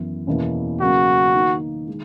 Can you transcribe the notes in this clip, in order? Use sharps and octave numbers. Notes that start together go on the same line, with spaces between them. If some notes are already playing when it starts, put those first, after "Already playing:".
Already playing: F#2 E3 B3 E4
E2 B2 A#3 C#4 E4
C#3 F#3 A#3 C#4 E4 F#4
D#3 A#3 D#4
D#3 G#3